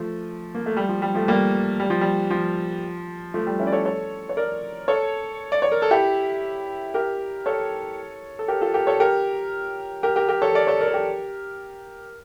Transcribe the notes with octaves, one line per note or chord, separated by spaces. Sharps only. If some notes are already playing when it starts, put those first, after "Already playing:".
Already playing: F3 A3
A#3
A3
G3
F3
G3
F3 A3
G3 A#3
G3
F3
G3
F3
F3 A3
G3
C#4 E4
D5
A4 C#5
A4 C#5
C#5
A#4 D5
A4 C#5
D5
C#5
A#4
A4
E4 G4
G4 A#4
A4 C#5
A4
G4 A#4
F4 A4
G4 A#4
A4 C#5
G4 A#4
G4 A#4
G4 A#4
G4 A#4
A4 C#5
A#4 D5
A4 C#5
A#4 D5
A4
G4 A#4